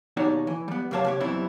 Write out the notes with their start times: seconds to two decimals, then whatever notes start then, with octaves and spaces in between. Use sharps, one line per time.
0.17 D#2 B2 D#4 C#5 D5
0.47 E3
0.68 G3 B3
0.91 F#2 C3 A#3 C#5 A5
1.05 C3 G4 C#5
1.20 F#2 B2 E3 G3 C4 E4